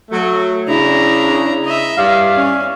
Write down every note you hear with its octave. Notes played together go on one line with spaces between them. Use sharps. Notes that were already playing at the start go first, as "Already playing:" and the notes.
F#3 A3
C#3 D4 E4 A#5
D#5 E5
G2 D5 F5
C#4